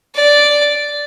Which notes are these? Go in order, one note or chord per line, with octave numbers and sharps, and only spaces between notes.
D5